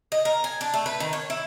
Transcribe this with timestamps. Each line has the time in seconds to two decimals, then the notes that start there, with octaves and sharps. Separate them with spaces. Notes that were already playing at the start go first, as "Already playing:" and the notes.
0.12 D#5
0.25 A#4
0.44 G#5
0.61 D4
0.74 A3
0.86 B4
1.00 D#3
1.13 C#5
1.30 E4